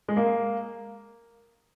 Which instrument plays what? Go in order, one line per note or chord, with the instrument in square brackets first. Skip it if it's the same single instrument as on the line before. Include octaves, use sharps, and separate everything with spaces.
[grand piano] G#3
A#3